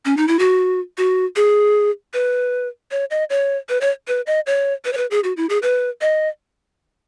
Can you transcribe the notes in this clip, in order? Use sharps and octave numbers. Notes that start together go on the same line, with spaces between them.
C#4
D#4
E4
F#4
F#4
G#4
B4
C#5
D#5
C#5
B4
C#5
B4
D#5
C#5
B4
C#5
B4
G#4
F#4
E4
G#4
B4
D#5